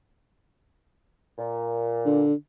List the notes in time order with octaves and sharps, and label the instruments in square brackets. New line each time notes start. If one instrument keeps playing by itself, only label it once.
[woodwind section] A#2
[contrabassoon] D3